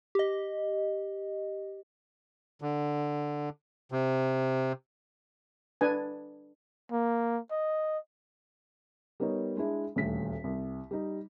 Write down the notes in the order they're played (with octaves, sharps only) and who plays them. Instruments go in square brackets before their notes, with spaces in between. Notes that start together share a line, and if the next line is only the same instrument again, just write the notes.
[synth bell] G4 D#5
[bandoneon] D3
C3
[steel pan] D4 B4 G#5
[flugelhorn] A#3
D#5
[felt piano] G3 B3 D#4 A#4 C#5
G#3 D4 E4
D#1 D2 B6
C2
G3 D#4